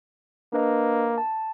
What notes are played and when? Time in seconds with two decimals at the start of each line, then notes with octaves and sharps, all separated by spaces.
0.53 A#3 D4 B4 D#5
1.18 A5